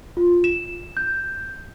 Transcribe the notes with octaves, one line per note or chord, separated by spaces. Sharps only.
F4
E7
G6